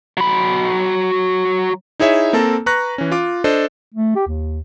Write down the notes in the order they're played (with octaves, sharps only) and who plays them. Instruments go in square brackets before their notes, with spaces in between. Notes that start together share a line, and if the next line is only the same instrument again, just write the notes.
[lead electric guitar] F#3 B5
[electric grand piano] D#4 E4 G#4 C#5 E5
A#3 C4 A4 A5 A#5
B4 A#5 C#6 F#6 A#6
E3 C#4
F4 D6
D4 A4 C5 D#5
[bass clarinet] A3
G4
D#2